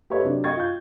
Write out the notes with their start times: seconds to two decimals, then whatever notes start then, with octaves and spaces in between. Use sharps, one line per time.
0.10 G4 A4 B4 C#5 D#5 E5
0.22 C3 F#3 D4
0.44 D#5 G5 C#6 G#6 A6
0.57 F4 G6